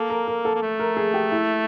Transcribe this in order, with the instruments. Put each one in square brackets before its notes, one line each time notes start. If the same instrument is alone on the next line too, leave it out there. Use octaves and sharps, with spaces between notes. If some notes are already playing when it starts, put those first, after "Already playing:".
Already playing: [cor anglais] A#3 [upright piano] A4
[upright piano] A#4
A#4
A4
[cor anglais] A#3
A3
[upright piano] A#4
G#4
G4
E4